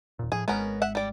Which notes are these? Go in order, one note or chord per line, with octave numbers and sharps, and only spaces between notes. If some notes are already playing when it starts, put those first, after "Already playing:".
D#1 A#2
A2 F3 G#4
G#1 G#3 B3 C#4 A#4
E5 F#5
G3 D5